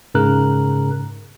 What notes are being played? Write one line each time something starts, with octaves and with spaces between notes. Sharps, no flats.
G#2 C#3 A#4 F#6